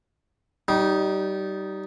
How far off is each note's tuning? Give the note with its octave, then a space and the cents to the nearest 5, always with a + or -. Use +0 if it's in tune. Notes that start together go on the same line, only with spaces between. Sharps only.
G3 -25 D#4 +0